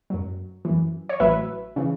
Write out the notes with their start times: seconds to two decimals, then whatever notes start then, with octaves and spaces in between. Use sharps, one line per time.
0.10 F#2 F#3
0.65 F#2 E3
1.09 C#5
1.20 A1 A2 F#3 B4 E5
1.76 C#3 E3